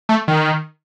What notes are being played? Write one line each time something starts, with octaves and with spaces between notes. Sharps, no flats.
A3
D#3